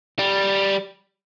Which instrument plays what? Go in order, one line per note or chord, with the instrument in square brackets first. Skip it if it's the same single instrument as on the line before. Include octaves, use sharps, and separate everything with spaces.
[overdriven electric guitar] G3